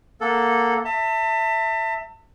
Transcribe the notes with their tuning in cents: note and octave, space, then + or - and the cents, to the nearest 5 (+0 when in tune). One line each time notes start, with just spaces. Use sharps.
A#3 +0 A4 +0 F#5 -20
E5 +0 A5 +35